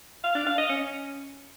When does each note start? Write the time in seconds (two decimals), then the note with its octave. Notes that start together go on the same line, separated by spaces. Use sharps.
0.24 F5
0.35 D4
0.47 F5
0.58 D#5
0.69 C#4